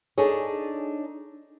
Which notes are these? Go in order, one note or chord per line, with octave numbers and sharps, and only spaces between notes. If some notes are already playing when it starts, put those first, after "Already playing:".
D4 D#4 G#4 A4 C#5